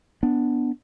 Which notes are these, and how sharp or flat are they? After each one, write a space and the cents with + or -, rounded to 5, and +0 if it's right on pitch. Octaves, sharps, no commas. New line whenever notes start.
B3 +0 D4 +0